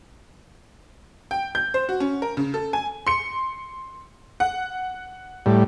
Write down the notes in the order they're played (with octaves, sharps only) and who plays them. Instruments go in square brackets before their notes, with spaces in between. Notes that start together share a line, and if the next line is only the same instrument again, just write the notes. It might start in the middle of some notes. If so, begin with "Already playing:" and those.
[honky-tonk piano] G5
G6
C5
F#4
C#4
A#4
C#3
A4
G#5
C6 C#7
F#5
[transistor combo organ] A2 G3